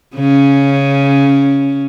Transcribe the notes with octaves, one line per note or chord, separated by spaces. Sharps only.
C#3 C#4